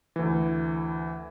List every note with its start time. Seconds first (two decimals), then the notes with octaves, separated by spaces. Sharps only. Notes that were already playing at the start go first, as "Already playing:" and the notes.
0.16 D2 E3